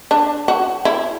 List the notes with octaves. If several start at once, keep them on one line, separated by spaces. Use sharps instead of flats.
D4
F#4
E4